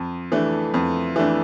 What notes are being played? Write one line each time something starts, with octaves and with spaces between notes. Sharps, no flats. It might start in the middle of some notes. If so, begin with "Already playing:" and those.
Already playing: F2
E3 A3 D4
F2
E3 A3 D4